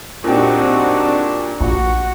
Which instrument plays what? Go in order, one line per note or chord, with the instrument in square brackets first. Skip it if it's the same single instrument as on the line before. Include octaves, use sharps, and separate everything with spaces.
[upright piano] A#2 G4 [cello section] C4 D#4 F#4 [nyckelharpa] D4
[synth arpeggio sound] A#1 [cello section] F#4